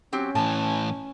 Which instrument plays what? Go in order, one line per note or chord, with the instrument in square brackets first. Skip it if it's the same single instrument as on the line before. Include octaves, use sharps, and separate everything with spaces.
[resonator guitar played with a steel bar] F#3 C4 G4 [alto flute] C#4
[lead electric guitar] A2 E3 [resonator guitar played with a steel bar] A5